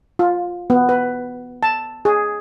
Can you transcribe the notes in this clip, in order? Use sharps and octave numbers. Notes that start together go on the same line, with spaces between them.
F4
B3
B4
A5
G#4